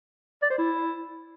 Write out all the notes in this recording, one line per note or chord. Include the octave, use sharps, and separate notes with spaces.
D5
C5
E4